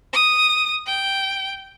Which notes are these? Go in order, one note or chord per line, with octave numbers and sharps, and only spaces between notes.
D#6
G5